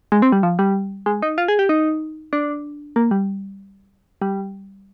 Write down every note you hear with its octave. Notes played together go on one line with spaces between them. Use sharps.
G#3
C4
G3
F3
G3
G#3
D#4
F4
G#4
G4
D#4
D4
A#3
G3
G3